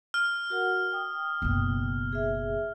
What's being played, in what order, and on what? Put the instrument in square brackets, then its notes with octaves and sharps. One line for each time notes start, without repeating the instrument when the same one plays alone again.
[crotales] F6
[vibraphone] F#4 A#4 F#5
G5 D#6
[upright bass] F#1 B2
[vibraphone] G#4 E5